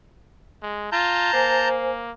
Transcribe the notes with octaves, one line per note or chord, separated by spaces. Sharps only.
G#3
F4 A5 A#5 G6
A#3 C5 G#5